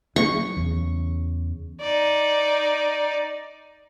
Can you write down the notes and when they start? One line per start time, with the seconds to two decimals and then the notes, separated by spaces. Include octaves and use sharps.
0.16 F#3 C#4 C#6
0.57 E2 C#3
1.81 D#4 D5